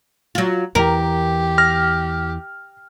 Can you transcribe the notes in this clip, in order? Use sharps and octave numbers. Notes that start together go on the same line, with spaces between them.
F#3 F4
E2 E3 G4 A#4
F6 A#6